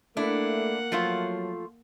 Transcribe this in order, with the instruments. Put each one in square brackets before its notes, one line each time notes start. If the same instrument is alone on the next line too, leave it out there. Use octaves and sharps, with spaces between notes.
[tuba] A3 [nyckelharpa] A#3 F#5 [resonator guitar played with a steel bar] D4 E4
[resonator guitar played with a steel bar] F3 A3 F4 [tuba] F#3